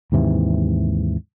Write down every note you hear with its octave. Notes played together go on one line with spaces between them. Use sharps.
D#2 G#2 C3 E3